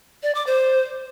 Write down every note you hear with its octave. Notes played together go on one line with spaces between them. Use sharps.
D5
D6
C5